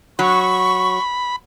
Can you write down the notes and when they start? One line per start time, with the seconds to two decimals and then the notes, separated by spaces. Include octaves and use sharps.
0.19 F#3 B5 C#6